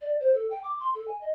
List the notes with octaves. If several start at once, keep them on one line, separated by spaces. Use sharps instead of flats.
D5
C5
A4
G5
D6
C6
A4
G#5
D#5